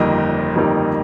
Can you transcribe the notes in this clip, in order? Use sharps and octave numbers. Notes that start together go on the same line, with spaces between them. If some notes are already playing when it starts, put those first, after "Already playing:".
Already playing: G1 F2 D#3 G3 A#3 D#5
G1 F2 D#3 G3 A#3